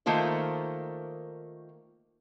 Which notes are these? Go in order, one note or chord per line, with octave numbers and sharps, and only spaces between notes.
D#3 A3 A#3 F4 C5